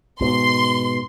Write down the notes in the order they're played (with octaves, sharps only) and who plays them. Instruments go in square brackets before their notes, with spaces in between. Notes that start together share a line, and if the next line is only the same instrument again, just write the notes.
[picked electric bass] G#2 B2 [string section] C6